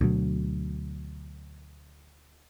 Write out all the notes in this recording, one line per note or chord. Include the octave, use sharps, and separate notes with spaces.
D2 B2 F#3